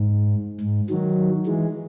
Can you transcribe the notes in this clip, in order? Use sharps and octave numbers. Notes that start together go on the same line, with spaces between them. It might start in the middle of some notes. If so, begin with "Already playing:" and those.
Already playing: G#2
G#2
D#3 F#3
E3 G#3